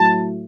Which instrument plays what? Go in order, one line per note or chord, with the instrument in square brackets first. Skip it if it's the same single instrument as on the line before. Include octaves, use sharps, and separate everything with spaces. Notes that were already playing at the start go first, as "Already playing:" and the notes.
Already playing: [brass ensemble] A2 F#3 A3 A5